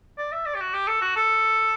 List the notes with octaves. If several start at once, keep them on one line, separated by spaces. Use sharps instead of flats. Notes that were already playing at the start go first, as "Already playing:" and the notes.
D5
E5
D5
G4
F#4
G4
A4
F#4
A4